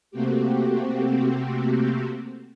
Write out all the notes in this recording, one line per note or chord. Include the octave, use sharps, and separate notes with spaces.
C3 A3 A#3 C4 F#4 G4